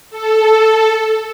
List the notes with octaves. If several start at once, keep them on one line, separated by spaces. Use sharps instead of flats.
A4